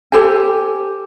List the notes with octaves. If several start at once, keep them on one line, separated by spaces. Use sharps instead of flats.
G4 A4 C5 G#5